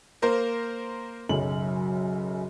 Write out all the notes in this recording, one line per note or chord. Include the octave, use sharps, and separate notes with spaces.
A#3 A#4 C5
B1 F#2 C#3 F#7